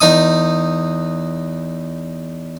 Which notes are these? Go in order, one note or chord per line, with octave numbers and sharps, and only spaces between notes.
E2 D#4 D#6